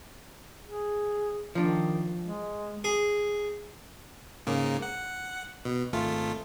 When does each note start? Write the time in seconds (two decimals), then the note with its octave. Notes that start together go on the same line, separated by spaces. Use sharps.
0.64 G#4
1.55 D#3 F3 D4
2.21 G#3
2.84 G#4
4.47 G#2 C#3 A#3
4.82 F#5
5.65 B2
5.93 G#1 A3 F4